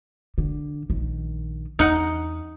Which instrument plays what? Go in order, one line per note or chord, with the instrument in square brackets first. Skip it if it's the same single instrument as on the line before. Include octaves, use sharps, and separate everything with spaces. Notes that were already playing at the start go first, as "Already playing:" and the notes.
[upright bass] D3
A#1 D#3
[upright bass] E2 [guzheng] D#4 F#5